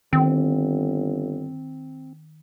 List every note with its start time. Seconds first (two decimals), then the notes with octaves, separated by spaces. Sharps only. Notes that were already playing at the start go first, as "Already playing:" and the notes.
0.13 G1 D#3 C4